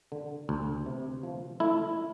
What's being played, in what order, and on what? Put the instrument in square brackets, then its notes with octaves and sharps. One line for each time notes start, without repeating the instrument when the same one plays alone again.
[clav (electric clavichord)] D3
D2
C3
F3
A3 E4